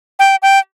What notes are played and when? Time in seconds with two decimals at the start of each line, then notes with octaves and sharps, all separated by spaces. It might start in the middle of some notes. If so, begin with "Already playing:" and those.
0.19 G5
0.42 G5